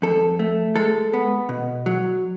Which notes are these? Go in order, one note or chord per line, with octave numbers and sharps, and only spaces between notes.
F2 A4
A3
G#3 A4
B3
B2
F#3